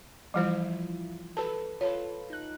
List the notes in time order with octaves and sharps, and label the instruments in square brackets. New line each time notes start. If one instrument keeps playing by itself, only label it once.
[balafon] E3 G3 C5 [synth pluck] F3 E4 F4
[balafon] F#4 A5 [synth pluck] A4 B4
[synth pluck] F4 A4 B4 [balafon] C#5
[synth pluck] D#4 F#6